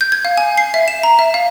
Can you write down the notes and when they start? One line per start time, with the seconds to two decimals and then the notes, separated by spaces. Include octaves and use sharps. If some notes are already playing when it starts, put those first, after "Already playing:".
0.01 G6
0.12 G#6
0.25 F5
0.37 G#5
0.58 C7
0.74 E5
0.88 E7
1.03 A#5
1.19 E5
1.34 F5